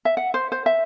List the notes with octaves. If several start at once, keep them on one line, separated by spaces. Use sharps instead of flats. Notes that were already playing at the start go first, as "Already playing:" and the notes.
E5
F#5
C5
C5
E5